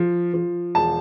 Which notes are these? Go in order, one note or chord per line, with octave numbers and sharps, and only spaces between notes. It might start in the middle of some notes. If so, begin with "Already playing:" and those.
Already playing: F3
F3
E1 A5